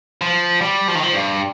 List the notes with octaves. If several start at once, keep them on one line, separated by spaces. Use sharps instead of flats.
F3
G3
F3
D#3
F3
G2